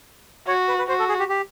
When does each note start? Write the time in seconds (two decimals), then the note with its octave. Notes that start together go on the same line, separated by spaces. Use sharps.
0.48 F#4 C#5
0.68 B4
0.78 B4
0.88 F#4 C5
0.99 A4
1.09 G#4
1.19 G4
1.29 G4